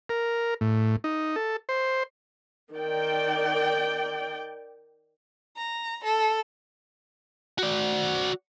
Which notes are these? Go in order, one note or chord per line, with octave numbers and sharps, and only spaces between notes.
A#4
A2
D#4
A4
C5
D#3 D5 G5
A#5
A4
F#4 D5